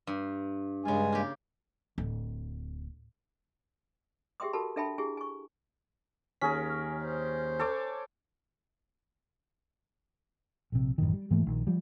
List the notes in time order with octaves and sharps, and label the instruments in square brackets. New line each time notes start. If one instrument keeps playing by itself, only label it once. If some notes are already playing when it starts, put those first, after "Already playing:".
[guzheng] G2
[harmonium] G2 G#3 G#5 [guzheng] C#3 F4
[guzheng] A#3 G4
[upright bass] D1
[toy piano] G4 G#4 E5 G5 C6 D#6
F#4 G4 A4 A#4 A5 B5
D4 A4 E5 G5 A5 B5
E4 G4 G#4 G#5
G#5 C#6
[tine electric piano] D#2 B6 [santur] C#4 G#4 A#4
[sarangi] C5
[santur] A4 C#5 D6
[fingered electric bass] A#1 C3
A1 F#2 B2 D#3
G3
G#2 E3 A3 A#3
A#1 D#3
F3 G3